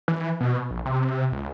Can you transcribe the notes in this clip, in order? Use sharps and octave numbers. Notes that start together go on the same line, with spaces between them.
E3
B2
A#1
C3
C#2